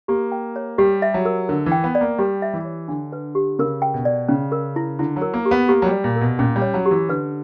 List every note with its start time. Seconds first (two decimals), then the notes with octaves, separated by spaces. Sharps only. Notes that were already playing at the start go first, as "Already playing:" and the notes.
0.08 A#3 G4
0.32 G5
0.56 C#5
0.78 G3 G4
1.02 E5
1.14 F#3
1.25 A#4
1.49 D3 A#4
1.66 E3
1.72 G5
1.84 B3
1.95 D5
2.01 A#3
2.19 G3 G4
2.42 E5
2.54 E3
2.65 C#5
2.88 D3 D4
3.13 B4
3.35 G4
3.59 C#3 A#4
3.82 G5
3.94 B2
4.05 D5
4.28 C#3 C#4
4.52 A#4
4.76 E4
4.99 D3 E4
5.16 F#3
5.22 A#4
5.34 A#3
5.46 G4
5.51 B3
5.69 A#3 G4
5.82 F#3
5.87 G3 D5
6.04 A#2
6.16 A#4
6.21 B2
6.39 A#2 C#4
6.56 G3
6.62 C#5
6.74 F#3
6.86 G4
6.91 E3
7.09 D3 B4